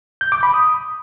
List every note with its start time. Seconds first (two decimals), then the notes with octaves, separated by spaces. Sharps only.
0.21 G6
0.32 D6
0.43 B5
0.54 D#6